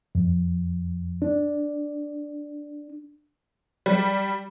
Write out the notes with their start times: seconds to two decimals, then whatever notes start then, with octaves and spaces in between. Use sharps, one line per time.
0.15 F2
1.22 D4
3.86 G3